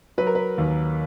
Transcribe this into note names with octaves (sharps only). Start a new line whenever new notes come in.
F#3 B4
A#4
B4
D#2